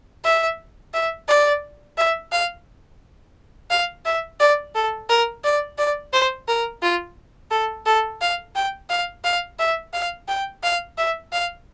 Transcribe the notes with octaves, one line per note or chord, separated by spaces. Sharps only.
E5
E5
D5
E5
F5
F5
E5
D5
A4
A#4
D5
D5
C5
A#4
F4
A4
A4
F5
G5
F5
F5
E5
F5
G5
F5
E5
F5